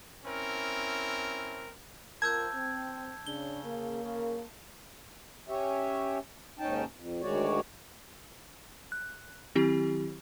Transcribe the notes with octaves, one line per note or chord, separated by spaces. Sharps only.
C4 C#4 E4 A#4
C4 F4 A#4 A5 E6 G6 G#6
C4
C#3 D4 G7
A#3
C#3 A#4
C#4 G4 C#5 E5
D#2 G#2 C#4 D#4 G5 A5
F2
D2 D#3 G#3 F#4 C#5 D5
F#6
D#3 F#3 C4 E4 G4